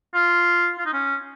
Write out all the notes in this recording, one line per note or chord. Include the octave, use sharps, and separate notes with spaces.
F4
F4
D#4
C#4